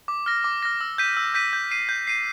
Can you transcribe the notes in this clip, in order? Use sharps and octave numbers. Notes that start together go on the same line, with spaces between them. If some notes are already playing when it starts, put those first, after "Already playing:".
D6
F6 A#6
D6
F6 A#6
E6
G6 B6 D#7
E6
G6 B6 D#7
G6
C7 D#7
G6
C7 D#7